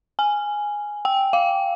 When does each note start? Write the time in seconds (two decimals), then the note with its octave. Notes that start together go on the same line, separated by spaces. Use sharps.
0.19 G#5
1.05 G5
1.33 F5